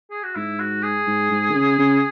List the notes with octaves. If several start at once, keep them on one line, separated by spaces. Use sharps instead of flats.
G#4
F#4
G#2 E4
F#4
G#4
G#2
G#2
D#3
C#3
C#3